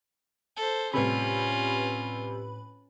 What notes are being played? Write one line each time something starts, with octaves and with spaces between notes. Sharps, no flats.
A4 C5
A2 C3 G3 C#4 F4 B4 B5